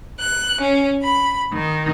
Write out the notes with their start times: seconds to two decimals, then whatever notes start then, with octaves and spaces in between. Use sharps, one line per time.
0.20 F#6
0.61 C#4
1.03 B5
1.53 D#3